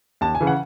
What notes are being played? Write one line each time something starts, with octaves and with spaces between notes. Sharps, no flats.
D#2 A5
G#5
C#3 E3
F#5